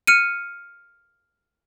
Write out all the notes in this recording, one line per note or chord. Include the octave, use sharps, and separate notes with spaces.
F6 C#7 D#7